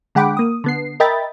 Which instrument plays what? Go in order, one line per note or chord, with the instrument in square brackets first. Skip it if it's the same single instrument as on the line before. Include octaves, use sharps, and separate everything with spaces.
[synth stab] D3 G#3 F#5 G5 B5 D6
A#3 D#6
D3 B3 C7
A#4 D#5 E5 G5 B5 A6